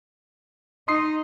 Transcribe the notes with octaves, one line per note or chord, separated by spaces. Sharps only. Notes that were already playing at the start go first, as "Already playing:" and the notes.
D#4 C6 D#6 C7